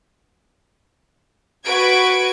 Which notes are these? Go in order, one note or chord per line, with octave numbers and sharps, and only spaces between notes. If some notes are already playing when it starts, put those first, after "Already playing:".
F#4 B4 G#6 D7